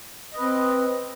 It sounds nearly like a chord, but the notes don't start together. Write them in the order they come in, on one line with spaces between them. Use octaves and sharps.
D#5 B4 C4